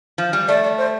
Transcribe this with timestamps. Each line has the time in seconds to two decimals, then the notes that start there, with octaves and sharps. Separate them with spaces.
0.18 F3
0.33 G3
0.48 A3 D5
0.63 D5
0.78 C5